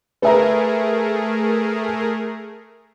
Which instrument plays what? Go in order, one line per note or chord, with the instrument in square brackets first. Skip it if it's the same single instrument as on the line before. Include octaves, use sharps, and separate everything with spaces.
[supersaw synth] A3 G#4 A#4 [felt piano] B4 E5 A#5